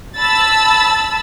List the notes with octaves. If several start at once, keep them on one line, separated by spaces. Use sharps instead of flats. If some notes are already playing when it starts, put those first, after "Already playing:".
A5 B5 E6 A6